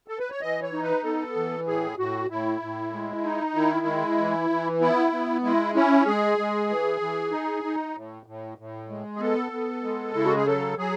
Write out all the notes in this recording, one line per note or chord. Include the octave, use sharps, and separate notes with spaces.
A4
B4
C#5
E3 D#5
C#5
D#4
B4
B3 A4
E3
A2 G#4
A2 F#4
A2 E4
A2
G#3
D#4
D#3 E4
G#3
E3
E3
B3 E4
B3
G#3 E4
C#4 E4
G#3 G#4
G#3
E3
E3
D#4
D#4
A2
A2
A2
G#3
G#4
B3 A4
B3
G#3
C#3 E4
F#4
G#4
F#3 A4
F#3 G#4